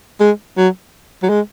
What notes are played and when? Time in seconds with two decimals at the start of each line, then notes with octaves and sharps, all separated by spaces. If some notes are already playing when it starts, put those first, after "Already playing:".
0.20 G#3
0.57 F#3
1.23 F#3
1.29 G#3